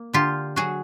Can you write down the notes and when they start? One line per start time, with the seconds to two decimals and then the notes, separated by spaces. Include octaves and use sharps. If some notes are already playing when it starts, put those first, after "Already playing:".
Already playing: A#3
0.14 D3 F4 G4
0.56 F#3 F#4 G#4